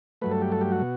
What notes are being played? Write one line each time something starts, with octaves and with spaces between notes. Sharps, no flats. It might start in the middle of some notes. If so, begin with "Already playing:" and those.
G2 F#3 A3 B4
A4
G4
A4
G4
F#4
B2